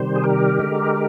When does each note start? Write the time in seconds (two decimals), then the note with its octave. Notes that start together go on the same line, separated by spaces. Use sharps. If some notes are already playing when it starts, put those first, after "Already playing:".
Already playing: C3 D#3 G3 C5
0.16 G#4
0.24 G4 A#4
0.60 D3 G#3